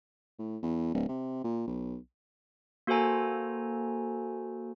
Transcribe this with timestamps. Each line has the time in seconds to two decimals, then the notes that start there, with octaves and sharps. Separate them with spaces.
0.39 A2
0.62 E2
0.94 D1
1.09 C3
1.44 A#2
1.67 B1
2.87 A#3 F#4 A4 C5 G#5 A#5